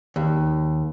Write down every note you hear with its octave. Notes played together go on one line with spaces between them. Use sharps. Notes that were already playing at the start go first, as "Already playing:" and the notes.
D#2